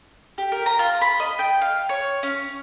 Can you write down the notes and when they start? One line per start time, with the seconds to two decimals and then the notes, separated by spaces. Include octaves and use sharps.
0.38 G4
0.52 A#4
0.66 A#5
0.79 F4
1.01 B5
1.20 D#5
1.39 G5
1.61 F5
1.89 C#5
2.23 C#4